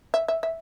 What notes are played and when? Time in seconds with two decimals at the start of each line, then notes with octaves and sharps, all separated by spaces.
0.14 E5
0.28 E5
0.43 E5